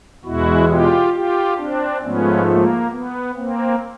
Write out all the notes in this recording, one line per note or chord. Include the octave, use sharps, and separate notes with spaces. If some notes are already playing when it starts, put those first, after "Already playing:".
E2 B2 G#3 E4 F#4
F4 G4
F4 G4
C4 D4
G#2 F3 A3 B3 C#4
A#3
B3
A#3 C4